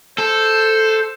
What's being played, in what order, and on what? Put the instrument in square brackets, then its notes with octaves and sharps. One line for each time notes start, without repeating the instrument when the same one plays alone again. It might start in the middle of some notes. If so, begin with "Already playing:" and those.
[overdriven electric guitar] A4 [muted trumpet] C5